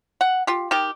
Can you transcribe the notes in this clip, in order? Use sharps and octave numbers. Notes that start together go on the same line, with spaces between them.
F#5
F4 G4
D#3 G4